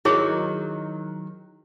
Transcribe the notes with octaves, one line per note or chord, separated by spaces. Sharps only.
D#3 F#3 E4 G#4 C#5